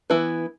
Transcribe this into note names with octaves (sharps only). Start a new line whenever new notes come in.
E3 B3 E4 B4